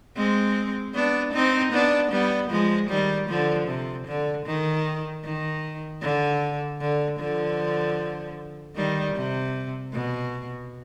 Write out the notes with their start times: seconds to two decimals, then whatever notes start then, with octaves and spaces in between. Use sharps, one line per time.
0.16 G#3 C4
0.94 B3 D4
1.33 C4 D#4
1.73 B3 D4
2.12 G3 B3
2.50 F3 G#3
2.90 D#3 G3
3.29 D3 F3
3.68 C3
4.07 D3
4.46 D#3
5.24 D#3
6.02 D3
6.81 D3
7.20 D3 F3
8.76 D#3 G3
9.15 C3
9.93 B2